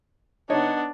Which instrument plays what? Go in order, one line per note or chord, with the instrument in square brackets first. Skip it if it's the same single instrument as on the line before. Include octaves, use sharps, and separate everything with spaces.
[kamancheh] B3 D4 [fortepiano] D#4 C#5 D#5